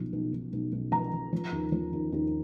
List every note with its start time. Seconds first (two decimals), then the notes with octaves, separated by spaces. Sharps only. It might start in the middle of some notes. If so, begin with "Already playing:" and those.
Already playing: B1 F3
0.13 B1
0.33 B1
0.53 B1
0.72 B1
0.92 F3 A#5
1.12 F3
1.33 F3
1.52 D#2
1.72 F3
1.93 D#2
2.12 D#2